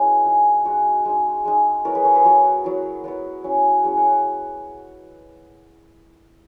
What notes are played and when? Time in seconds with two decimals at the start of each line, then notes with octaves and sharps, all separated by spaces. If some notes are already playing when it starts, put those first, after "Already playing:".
Already playing: G#3 C#4 E4 F#4 B4
0.25 G#3 D#4 G#4
0.65 G#3 D#4 F#4
1.05 G#3 D#4
1.45 G#3 D#4
1.85 F#3 B3 E4 F#4 A#4
1.95 G#4 B4
2.04 A#4 C#5
2.15 G#4 B4
2.24 F#3 B3 E4 F#4 A#4
2.64 F#3 B3 E4
3.04 F#3 B3 E4 F#4
3.44 F#3 C#4 E4
3.84 F#3 C#4 E4 G#4
3.97 D#5 F#5
4.11 C#5 E5